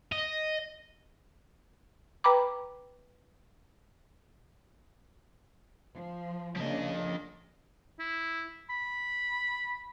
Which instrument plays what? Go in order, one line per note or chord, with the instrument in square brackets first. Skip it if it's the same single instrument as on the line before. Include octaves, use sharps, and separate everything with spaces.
[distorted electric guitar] D#5
[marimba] B4 G5 A#5 B5 D6
[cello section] F3
[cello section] C#3 A#3 D4 [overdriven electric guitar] F3 D#5
[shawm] E4
B5